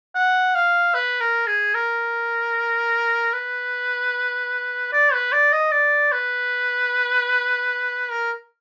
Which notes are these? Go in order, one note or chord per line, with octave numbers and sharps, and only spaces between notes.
F#5
F5
B4
A#4
G#4
A#4
B4
D5
B4
D5
D#5
D5
B4
A#4